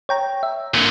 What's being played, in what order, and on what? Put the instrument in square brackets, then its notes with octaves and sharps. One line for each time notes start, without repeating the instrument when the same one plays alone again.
[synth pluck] C#5 G5 A#5
E5
[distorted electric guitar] A#2 D3